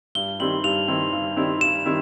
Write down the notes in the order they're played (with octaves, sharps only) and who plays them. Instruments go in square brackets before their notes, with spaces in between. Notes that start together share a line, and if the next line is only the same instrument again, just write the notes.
[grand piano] G2 [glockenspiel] G7
[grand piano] D#3 G3 C4 E4 [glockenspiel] F#7
[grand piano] G2 [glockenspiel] F7
[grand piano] D#3 G3 C4 E4
G2
D#3 G3 C4 E4
[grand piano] G2 [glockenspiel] E7
[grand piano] D#3 G3 C4 E4